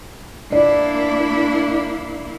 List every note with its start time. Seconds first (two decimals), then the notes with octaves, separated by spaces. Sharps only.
0.52 A#3 D4 E4 D5